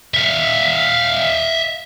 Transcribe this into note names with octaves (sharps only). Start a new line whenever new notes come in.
E5 F5